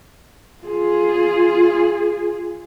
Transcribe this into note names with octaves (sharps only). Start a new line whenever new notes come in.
F4 G#4